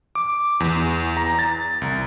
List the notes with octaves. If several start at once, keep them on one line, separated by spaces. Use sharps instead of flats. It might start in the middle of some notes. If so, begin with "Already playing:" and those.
D6
E2
A#5
A6
C2